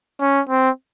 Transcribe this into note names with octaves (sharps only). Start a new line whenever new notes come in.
C#4
C4